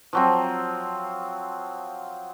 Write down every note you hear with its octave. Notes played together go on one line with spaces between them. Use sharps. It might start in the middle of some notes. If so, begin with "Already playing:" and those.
F3 F#3 C4